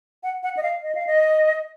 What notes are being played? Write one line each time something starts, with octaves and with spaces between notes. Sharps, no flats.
F#5
F#5
D#5
F5
D#5
F5
D#5